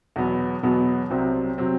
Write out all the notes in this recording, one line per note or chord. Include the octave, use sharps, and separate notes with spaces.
E2 B2 F#3 B3
E2 B2 F#3 B3
C2 C3 F#3 C4
C3 F#3 C4